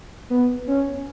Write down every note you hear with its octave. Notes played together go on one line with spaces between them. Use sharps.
B3
C#4